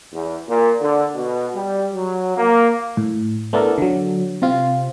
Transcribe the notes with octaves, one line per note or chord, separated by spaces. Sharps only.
E2
A#2
D3
B2
G3
F#3
A#3
A2
A3 B3 D4 E4 A4 A#4
D3 F#3
C3 C4 F4